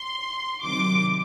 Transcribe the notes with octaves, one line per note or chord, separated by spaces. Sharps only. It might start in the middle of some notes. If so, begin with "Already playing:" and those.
Already playing: C6
C3 D#3 F#3 D6